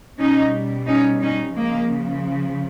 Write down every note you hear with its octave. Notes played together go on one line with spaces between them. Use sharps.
B2 G3 C#4 D#4
C#4 D#4
C#4 D#4
C#3 F3 G#3 A#3